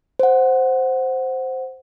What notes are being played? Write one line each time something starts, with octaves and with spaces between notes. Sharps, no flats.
C5 F#5